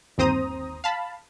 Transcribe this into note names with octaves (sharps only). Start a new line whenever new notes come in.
G1 D#2 C4 C5 A#5 D#6
F5 A5 B5